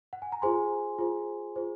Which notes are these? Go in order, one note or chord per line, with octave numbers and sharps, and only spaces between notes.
F#5
G#5
A#5
F4 G#4 C5 G#5 C6
F4 G#4 C5
F4 G#4 C5